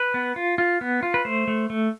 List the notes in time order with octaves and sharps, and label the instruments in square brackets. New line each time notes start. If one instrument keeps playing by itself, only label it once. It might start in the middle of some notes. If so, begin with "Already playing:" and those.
Already playing: [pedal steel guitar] B4
B3
F4
F4
B3
F4
B4
A3 C5
A3
A3